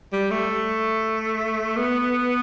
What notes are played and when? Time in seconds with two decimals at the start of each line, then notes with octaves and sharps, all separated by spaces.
0.12 G3
0.31 A3
1.76 B3